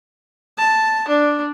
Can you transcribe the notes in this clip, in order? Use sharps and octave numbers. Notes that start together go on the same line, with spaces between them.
A5
D4